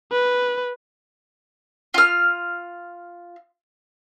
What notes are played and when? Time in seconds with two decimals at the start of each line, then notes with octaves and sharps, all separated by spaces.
0.12 B4
1.94 F4 F6